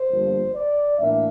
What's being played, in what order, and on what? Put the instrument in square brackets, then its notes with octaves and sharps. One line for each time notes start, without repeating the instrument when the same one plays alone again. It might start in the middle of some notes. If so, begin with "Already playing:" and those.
Already playing: [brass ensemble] C5
G1 G2 F3 A#3
D5
A2 E3 A#3 D4 E5